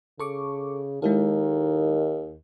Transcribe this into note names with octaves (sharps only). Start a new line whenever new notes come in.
C#3 A4 C#6 D6
D#2 D#3 G#3 E4 A4